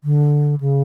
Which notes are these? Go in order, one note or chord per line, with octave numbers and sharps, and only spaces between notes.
D3
C#3